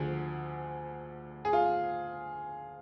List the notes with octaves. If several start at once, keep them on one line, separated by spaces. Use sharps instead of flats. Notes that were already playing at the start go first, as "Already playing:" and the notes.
Already playing: D2 D3 F3 G#4
G#4
F4